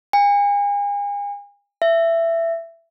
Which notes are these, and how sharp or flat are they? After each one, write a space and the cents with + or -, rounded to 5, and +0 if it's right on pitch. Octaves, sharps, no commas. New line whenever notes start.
G#5 -40
E5 +15